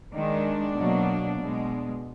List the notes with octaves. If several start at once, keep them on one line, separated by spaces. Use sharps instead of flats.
D#3 G#3 D4
B2 F#3 A#3
B2 G#3